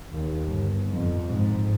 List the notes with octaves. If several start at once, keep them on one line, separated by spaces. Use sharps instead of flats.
D#2
G1
F2
G#2